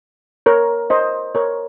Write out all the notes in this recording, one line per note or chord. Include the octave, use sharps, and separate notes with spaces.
A#4 C#5
C5 D#5
A#4 C#5